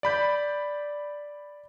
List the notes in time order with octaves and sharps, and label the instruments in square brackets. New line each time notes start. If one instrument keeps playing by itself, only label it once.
[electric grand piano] D5 B5 G6